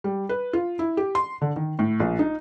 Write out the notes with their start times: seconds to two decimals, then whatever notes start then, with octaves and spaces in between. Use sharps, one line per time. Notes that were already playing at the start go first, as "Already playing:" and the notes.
0.04 G3
0.29 B4
0.53 F4
0.79 E4
0.97 G4
1.15 C6
1.41 D3
1.56 D#3
1.79 A2
2.00 A#1
2.19 D#4